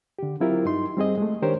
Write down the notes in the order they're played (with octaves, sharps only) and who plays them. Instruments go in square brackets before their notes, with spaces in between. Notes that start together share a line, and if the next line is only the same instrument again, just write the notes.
[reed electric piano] D3 G4
F#3 C4 E4 F4 G4 A#4
G2 D#4 C6
G3 C4 G#4 D#5
G#3 A3
D#3 D4 G4 A#4 C5 C#5